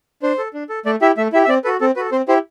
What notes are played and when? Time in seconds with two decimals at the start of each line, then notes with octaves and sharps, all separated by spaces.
0.22 D4 C5
0.38 A4
0.54 D4
0.69 A4
0.86 A3 D5
1.01 E4 G4 E5
1.17 A3 E5
1.33 E4 G4 E5
1.45 E5
1.48 C4 D5
1.64 F#4 A4 B4
1.80 C4 A4
1.96 F#4 A4 B4
2.12 C4 C5
2.28 E4 G4 C5